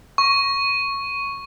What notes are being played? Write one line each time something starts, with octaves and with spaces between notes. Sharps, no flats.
C#6